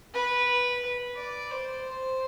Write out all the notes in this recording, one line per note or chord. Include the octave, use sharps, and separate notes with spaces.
B4
D5
C5